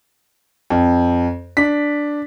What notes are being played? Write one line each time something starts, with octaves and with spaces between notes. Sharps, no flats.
F2
D4 B6